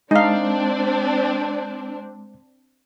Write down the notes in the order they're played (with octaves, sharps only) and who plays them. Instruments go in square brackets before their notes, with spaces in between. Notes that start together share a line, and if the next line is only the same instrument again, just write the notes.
[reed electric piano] G#3 [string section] C4 D4 C5 [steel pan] D#4 F5